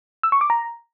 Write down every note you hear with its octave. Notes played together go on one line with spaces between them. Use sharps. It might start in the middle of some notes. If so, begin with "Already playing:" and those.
E6
C#6
D6
A#5